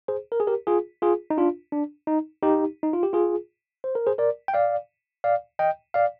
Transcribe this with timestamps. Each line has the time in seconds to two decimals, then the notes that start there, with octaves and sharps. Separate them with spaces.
0.08 G#4 C5
0.32 A#4
0.40 G#4
0.47 G4 A#4
0.67 F4 G#4
1.02 F4 G#4
1.30 D#4
1.38 D4 F4
1.72 D4
2.07 D#4
2.42 D#4 G4
2.83 D#4
2.93 F4
3.03 G4
3.13 F4 G#4
3.84 C5
3.95 A#4
4.07 G#4 C5
4.18 A#4 D5
4.48 G5
4.54 D5 F5
5.24 D5 F5
5.59 D#5 G5
5.94 D5 F5